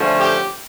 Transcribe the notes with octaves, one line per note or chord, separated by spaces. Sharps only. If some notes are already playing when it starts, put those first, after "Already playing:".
Already playing: D3 F3 A3 C#4
G4